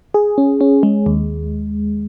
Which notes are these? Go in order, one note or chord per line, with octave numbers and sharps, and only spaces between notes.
G#4
C#4
C#4
G#3
D#2